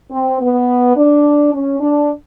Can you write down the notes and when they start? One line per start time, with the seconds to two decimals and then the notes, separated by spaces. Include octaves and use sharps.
0.11 C4
0.40 B3
0.96 D4
1.53 C#4
1.80 D4